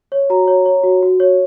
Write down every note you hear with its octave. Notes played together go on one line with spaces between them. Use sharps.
C#5
F#4 A#5
C#5
C#5
F#4
F#4
C#5